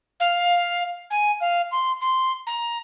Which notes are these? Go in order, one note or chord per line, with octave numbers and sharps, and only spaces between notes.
F5
G#5
F5
C6
C6
A#5